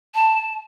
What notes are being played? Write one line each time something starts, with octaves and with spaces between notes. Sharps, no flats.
A5